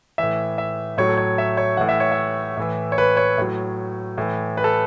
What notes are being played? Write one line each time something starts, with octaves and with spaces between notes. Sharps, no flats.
A2 E3 E5
E5
A2 F#3 C#5
A4
C#5
E5
C#5
A2 E3 F#5
E5
C#5
E5
A2 E3
C#5
B4
C#5
A2 F#3
A2 E3
B4
A4